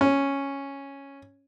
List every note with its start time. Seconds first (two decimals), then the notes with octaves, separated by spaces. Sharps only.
0.01 C#4